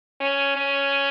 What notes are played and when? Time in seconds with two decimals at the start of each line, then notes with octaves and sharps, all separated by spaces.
0.21 C#4
0.56 C#4